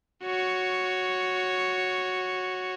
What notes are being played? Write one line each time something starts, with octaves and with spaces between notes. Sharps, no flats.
F#4 C#5